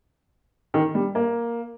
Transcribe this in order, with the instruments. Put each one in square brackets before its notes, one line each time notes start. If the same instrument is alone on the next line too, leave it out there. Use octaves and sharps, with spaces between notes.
[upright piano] D#3
G3
A#3